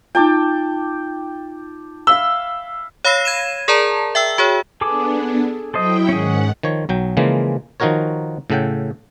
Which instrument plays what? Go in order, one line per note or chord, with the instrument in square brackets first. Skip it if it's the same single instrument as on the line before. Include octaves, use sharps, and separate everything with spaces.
[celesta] D#4 F4 [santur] G5 A5 D6
[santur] E5 F5 B5 [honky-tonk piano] E6 [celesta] G7
[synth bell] C#5 F5 B5 E6 A#6 C7
G#6 D#7 E7
G#4 A#4 D5 A5 A#5
E5 G5 E6
F#4 G#4 C#5
[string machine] B3 D4 [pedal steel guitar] G#4 A4 D6
[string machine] F#3 E4 G5 [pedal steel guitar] A4 C5 D#5
[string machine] G#2 D#3 F#5 [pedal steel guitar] C#4 G#4
[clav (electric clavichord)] D#3 F3 C#5
B1 F#3 G5
C#3 E3 F3 G#3 A#3
D#3 F3 D#4 F#4 A#4 C#5
A2 C#3 A4 F#5 G5